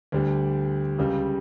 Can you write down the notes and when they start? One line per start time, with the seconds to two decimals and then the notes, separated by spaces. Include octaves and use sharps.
0.12 D2 D3 G3
0.99 C#2 C#3 G3